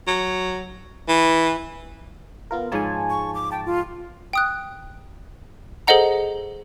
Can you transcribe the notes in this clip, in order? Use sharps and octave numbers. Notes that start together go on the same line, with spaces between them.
F#3
E3
B3 F4 A#4
G#2 F3 C#5 G#5 A5
C#6
D6
G5 A5
F4
G5 D#6 F#6
G#4 A4 C5 D#5 F#5 A#5